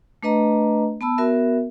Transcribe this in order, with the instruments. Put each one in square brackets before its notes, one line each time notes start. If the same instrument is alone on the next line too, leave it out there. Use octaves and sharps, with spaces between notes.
[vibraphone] A3 D4 B4 D#5 A#5
B3 A5 B5 E6
B3 F#4 A#4 E5